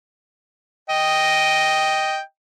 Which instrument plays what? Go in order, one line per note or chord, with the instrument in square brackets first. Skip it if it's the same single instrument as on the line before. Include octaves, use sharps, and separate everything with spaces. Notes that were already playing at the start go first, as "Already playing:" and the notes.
[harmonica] D#5 G5